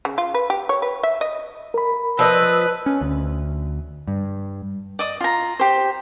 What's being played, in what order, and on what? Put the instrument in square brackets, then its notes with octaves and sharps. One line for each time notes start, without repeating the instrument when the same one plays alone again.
[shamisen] C#3
F4
B4
G4
C#5
B4
E5
D#5
[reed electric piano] A#4 B5
[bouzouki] F3 D#5 [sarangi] B4 [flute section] E6
[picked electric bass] C#4
D2
G2
[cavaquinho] D5 D#5 D#6
F4 A#5
G4 C5